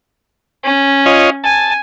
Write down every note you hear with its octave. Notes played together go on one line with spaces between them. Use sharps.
C#4
F4 C#5 D#5
G#5 A5